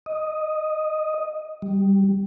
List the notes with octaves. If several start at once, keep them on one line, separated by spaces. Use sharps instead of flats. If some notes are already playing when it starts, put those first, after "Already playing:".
D#5
G3